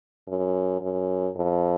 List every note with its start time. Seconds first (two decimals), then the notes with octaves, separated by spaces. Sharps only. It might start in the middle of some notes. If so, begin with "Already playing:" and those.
0.28 F#2
0.81 F#2
1.36 F2